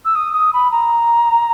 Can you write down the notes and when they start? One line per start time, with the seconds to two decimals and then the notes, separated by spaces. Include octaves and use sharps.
0.05 E6
0.15 D#6
0.34 D#6
0.53 B5
0.72 A#5